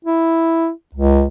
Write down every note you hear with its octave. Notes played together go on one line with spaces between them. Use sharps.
E4
C#2